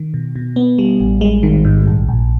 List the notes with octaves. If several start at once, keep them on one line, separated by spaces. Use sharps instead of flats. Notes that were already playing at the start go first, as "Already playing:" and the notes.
Already playing: D#3
B2
B2
B3
G3
A1
G#3
D#3
G#2
A#1
A#1